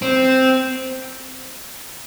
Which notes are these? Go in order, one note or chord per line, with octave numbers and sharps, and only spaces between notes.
C4